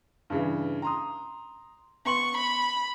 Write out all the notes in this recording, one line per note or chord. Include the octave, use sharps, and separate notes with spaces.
G2 C#3 E3
A#5 C6 D#6
B3 C6 C#6 F#7
B5